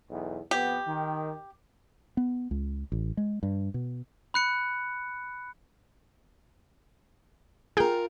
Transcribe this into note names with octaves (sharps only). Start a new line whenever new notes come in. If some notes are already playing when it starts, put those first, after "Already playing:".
B1 E2
F2 B3 G4
D#3
B3
C#2
A1
G#3
G2
B2
B5 F#6 C#7
F4 G#4 A#4 G5